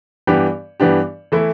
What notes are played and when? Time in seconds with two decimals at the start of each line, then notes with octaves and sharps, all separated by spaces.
0.27 G2 E3 B3 D4 G4
0.80 G2 E3 B3 D4 G4
1.32 E3 A3 E4